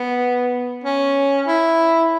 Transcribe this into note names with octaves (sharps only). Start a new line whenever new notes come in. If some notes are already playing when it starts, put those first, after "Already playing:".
Already playing: B3
C#4
E4